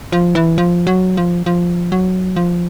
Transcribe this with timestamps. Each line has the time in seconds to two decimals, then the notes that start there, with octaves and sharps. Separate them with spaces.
0.12 F3
0.35 E3
0.58 F3
0.87 F#3
1.17 F3
1.46 F3
1.92 F#3
2.36 F3